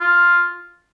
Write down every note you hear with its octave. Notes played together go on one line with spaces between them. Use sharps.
F4